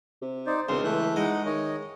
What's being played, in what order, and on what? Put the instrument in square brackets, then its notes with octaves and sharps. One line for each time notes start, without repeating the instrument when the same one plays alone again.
[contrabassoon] C3
[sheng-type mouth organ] D#4 C5 D5
[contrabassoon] E1 [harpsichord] C#2 [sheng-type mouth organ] C4 C6
[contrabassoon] E3 [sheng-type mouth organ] A3 F#6 G6
[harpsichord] G#3 [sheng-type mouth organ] D#4 F#5
[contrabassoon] D#3 [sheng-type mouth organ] C#5 D#5